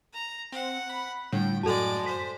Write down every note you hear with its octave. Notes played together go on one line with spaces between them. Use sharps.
A#5
C4 F#5
B5
A2 D3 G3 G5
F#2 G#3 F#4 A4 D5 A5
C5 B6